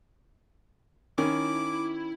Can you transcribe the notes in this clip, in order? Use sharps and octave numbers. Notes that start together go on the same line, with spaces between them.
D#3 C#4 E4 D6